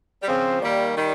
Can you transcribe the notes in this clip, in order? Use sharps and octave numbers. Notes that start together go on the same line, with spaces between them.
G3
C#3 F3 C4
D#3 G3 A#3
D#3 G3